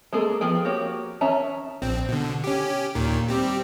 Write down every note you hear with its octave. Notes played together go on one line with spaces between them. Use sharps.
G#3 A#3 G#4 A4
F3 B3 G#4 G5
A#3 F#4 G4 C#5
D#3 C#4 E5 A5 A#5
A#1 C4
B2 D3
C#4 G4
D#2 A#2 D#3
G3 C4 G4